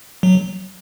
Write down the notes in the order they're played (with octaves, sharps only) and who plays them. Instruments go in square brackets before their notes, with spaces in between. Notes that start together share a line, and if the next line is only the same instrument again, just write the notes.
[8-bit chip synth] F#3